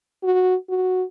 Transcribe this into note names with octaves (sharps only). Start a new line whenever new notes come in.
F#4
F#4